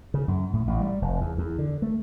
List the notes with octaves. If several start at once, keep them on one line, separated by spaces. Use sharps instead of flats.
C#3
F#2
A2
A1
G3
F1
E2
E2
D3
A3